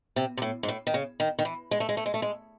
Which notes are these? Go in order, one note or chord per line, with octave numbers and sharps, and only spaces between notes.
C3
C3
A2
G#2
A2
D#3
C#3
D#3
D#3
E3
G#3
A3
G#3
A3
G#3
A3
G#3